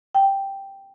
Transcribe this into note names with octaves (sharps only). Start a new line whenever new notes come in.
G5